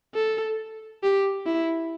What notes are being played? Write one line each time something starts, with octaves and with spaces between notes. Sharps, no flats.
A4
G4
E4